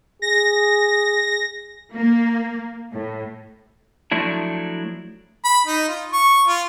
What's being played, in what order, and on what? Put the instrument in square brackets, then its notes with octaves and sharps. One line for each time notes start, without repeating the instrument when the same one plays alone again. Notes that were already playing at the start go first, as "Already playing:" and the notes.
[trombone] G#4 [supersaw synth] A#6
[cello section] A#3
A2
[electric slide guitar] F3 F#3 A3 D4 E4
[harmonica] B5
D#4
F4
C#6
F4